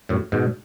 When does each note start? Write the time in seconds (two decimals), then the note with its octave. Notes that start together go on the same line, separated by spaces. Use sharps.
0.09 F#2 A2
0.32 G#2 B2